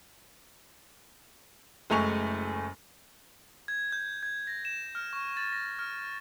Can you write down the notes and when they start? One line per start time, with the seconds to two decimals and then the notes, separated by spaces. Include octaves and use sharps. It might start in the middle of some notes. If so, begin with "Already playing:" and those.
1.90 F#1 G#3 A3 G#5 C#6 F7
3.68 G#6
3.92 G6
4.23 G#6
4.47 A#6
4.65 E7
4.95 F6
5.13 C#6
5.37 A6
5.53 A#6
5.79 F6